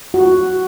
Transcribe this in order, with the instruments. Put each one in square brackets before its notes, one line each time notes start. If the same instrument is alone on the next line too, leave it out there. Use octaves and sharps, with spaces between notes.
[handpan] F#4